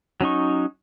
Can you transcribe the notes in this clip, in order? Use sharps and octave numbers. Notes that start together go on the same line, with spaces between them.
F#3 C#4 D#4 C#6